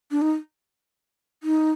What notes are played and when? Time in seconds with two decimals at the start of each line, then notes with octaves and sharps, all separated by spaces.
0.11 D4
0.22 D#4
1.43 D#4